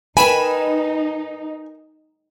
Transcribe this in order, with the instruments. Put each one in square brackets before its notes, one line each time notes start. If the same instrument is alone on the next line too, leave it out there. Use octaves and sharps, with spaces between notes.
[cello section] D#4 [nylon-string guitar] A#4 B4 G5 [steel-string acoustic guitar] G#5 [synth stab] B5 E7